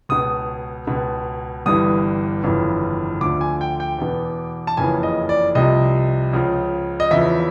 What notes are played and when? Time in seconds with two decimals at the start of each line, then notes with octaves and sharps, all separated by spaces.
0.09 C#2 B2 D#6
0.87 C#2 B2
1.66 G1 G2 E3 D#6
2.43 G1 F2 C#3 E3
3.21 D2 D3 F3 D6
3.41 G#5
3.61 G5
3.80 G5
3.99 E2 B2
4.67 A5
4.77 F#1 F2 C#3 E3 G#5
5.03 D#5
5.29 D5
5.55 C2 C3 F3 D#5
6.33 C#2 C#3 F3
7.00 D#5
7.11 E2 C#3 F3 E5